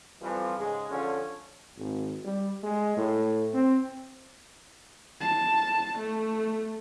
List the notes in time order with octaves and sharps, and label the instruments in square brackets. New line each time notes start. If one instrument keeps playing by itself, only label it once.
[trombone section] F2 E3 F3 G3
G#2 C#3 G#3
D3 F3 C#4
[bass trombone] G#1
G3
G#3
A2
C4
[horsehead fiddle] A5
A3